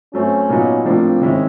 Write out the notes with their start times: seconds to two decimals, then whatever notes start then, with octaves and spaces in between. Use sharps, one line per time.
0.14 F#3 A3 C4 C#4
0.49 A#2 F#3 B3 D#4
0.85 A2 F3 A#3 C4 D4
1.22 D#3 G#3 C#4 E4